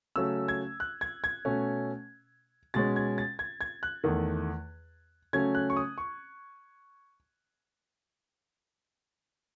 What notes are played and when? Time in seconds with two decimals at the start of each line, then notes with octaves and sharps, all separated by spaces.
0.16 C#3 F#3 A3 C#4 E6
0.48 G#6
0.80 F#6
1.01 G#6
1.24 G#6
1.45 B2 A3 C#4
2.74 B2 G#3 C#4 A6
2.96 G#6
3.18 A6
3.39 G#6
3.61 G#6
3.83 F#6
4.04 E2 D#3 A3
5.33 C#3 F#3 A3 C#4 G#6
5.55 F#6
5.70 C#6
5.77 D#6
5.98 C#6